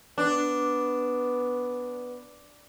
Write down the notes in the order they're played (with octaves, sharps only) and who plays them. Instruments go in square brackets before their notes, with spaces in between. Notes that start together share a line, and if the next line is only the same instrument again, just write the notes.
[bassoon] B3 [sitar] D4